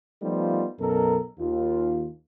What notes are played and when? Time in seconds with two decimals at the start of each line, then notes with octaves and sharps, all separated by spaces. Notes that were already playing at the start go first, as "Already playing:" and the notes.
0.22 F3 G3 A3 B3 D#4 F4
0.79 B1 F#2 B2 A4 A#4
1.39 D#2 F4